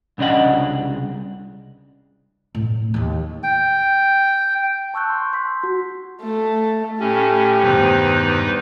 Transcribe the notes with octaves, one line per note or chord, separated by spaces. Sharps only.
C2 C#3 D4 D#5 F#5
A2
D#2 D#4
G5
A5 C#6 E6 F#6 G6
C6
C6 G6 B6
F#4
A3
A2 A3 C#4 G4
E2 G2 B2 D#3 D#4 B4 C5